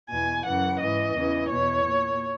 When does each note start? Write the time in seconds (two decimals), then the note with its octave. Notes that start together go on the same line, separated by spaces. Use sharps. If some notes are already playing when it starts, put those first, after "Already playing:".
0.10 E2 B2 G#5
0.46 F#2 C#3 E3 F#5
0.80 G#2 E3 D#5
1.16 E2 C#3 E3
1.50 E2 B2 C#5
1.85 A#2